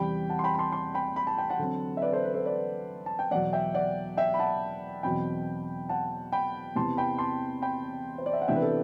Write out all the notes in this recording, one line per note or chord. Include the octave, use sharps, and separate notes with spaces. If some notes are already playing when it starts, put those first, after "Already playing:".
Already playing: E2 C3 G3 G5 B5
F#5 A5
C6
G5 B5
B5
A5 C6
A5 C6
G5 B5
B5
A5
G5
F#5 A5
D3 F#3 C4
E5
B4 D5
A4 C5
B4
A4 C5
B4 D5
A5
G5
E2 B2 F#3 D5 F#5
E5 G5
D5 F#5
E5 G5
B5
F#5 A5
E2 B2 F#3 C4 G5 B5
F#5 A5
G5 B5
E2 C3 E3 B3 A5 C6
G5 B5
A5 C6
G5 B5
C5
D5
E5
F#5
C3 E3 B3 D4 E5 G5
B4
A4